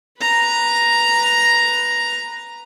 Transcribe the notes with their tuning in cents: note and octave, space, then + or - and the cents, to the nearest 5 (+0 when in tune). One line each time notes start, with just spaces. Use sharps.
B4 -5 A#5 +0